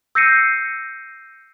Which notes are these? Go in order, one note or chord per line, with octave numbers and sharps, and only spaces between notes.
E6 G6 A#6 C7 C#7 D#7